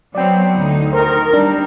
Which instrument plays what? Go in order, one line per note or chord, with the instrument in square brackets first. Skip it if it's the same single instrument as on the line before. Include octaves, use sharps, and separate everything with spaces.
[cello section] F#3 B3 C4 [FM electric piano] D5 G5
[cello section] D2 D#4
[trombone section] D#3 A#4 [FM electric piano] C5
[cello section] G3 C4 [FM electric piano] D4